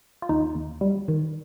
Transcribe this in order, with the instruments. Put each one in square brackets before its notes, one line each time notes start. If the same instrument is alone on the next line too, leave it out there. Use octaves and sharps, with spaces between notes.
[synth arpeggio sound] F4
D#2 D#4
D#2
G3
D#3